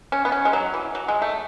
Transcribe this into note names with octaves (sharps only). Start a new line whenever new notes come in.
C#4
B3
C#4
G#3
F#3
E3
F#3
G#3
A3